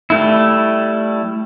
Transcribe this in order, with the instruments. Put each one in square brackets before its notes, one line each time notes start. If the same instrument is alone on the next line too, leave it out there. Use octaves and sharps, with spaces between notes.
[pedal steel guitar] G3 A3 E4